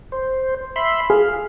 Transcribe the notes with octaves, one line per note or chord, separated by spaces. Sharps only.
C5
E5 B5 C6
G#4 F5